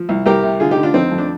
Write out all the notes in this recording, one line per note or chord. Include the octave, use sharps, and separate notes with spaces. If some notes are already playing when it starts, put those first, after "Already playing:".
Already playing: F3
C2
C2 G4 A#4
C3
D3 F4 G#4
D#4 G4
D3
D4 F4
F2 C4 D#4
F2
D4